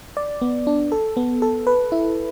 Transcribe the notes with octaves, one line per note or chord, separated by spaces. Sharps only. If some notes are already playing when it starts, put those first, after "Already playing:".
D5
B3
D4
A4
B3
A4
B4
E4